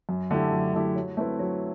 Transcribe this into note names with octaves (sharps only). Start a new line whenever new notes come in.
F#2
D3 A3 E4 G4
F#2
D3 A3 E4 G4
F#3
A3 C4 E4 B4
F#3